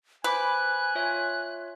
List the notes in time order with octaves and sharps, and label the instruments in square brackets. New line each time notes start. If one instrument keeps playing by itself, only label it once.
[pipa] B4 [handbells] C5 B5 D6 [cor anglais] G#5 [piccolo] F#6
[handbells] F4 C#5 E5